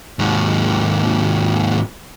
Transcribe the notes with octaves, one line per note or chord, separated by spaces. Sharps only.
D#2 G#2